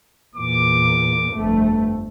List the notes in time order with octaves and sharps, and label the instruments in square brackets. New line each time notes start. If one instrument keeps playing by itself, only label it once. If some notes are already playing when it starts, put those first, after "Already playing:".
[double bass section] E2 A#2 [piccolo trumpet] D6
[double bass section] G1 F2 A3